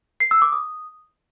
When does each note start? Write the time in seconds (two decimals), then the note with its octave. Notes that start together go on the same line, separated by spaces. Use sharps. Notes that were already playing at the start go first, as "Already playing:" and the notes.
0.20 C7
0.31 E6
0.42 D6
0.53 D#6